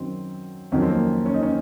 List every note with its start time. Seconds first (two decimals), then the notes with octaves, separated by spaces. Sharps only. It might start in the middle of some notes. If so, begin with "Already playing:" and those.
Already playing: F#2 D#3 F#3 C4
0.72 F2 D#3 F#3 C#4
0.82 C4
0.90 A#3
1.26 C#4
1.34 D#4
1.43 C#4